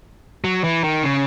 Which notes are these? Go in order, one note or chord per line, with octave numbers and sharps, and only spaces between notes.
F#3
E3
D#3
C#3